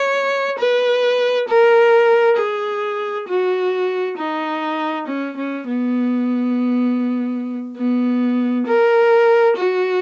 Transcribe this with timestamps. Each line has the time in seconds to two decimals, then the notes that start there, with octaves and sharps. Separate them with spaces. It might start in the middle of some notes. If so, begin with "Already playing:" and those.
Already playing: C#5
0.58 B4
1.48 A#4
2.37 G#4
3.28 F#4
4.17 D#4
5.07 C#4
5.37 C#4
5.67 B3
7.77 B3
8.67 A#4
9.56 F#4